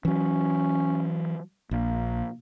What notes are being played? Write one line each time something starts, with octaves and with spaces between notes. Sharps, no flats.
E3 F#3 C#4
A#1 A#3